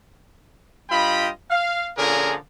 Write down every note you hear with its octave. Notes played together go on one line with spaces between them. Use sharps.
G2 F4 D#5 G5 B5
F5
A#2 D3 F3 C#4 G#4 A#4